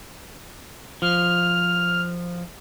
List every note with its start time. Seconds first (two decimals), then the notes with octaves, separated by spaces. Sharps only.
1.02 F3 F6